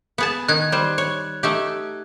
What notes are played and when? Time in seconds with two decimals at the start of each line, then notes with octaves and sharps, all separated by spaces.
0.18 B3 G#4 A5
0.49 D#3 D#4 F#6 G#6
0.72 G3 C5
0.98 C#5
1.43 A3 D#4 G4